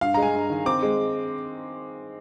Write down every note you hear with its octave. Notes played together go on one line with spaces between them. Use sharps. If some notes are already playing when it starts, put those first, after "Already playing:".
G2 F5
G#3 A#5
G#5
G2
D#3
C4 D6
G#3